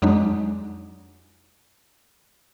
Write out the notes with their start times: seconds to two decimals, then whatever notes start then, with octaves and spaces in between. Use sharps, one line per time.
0.02 F2 F#3 G#3 D4 D#4